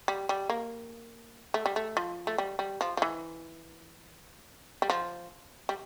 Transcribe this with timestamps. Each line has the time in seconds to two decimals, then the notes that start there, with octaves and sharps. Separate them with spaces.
0.08 G3
0.29 G3
0.50 A#3
1.54 A3
1.66 G3
1.76 A3
1.97 F3
2.27 A3
2.38 G3
2.59 G3
2.81 F3
2.97 F3
3.02 E3
4.82 G3
4.90 F3
5.69 G3